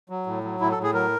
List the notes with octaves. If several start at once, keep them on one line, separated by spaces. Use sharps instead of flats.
F#3
A2
F#3
A2 E4
A4
A2
G#4
F#3 A#4